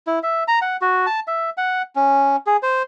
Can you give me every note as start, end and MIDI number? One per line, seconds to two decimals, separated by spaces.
0.07 0.19 64
0.23 0.44 76
0.48 0.59 82
0.62 0.77 78
0.81 1.06 66
1.06 1.20 81
1.27 1.50 76
1.57 1.82 78
1.95 2.36 61
2.47 2.57 68
2.63 2.82 72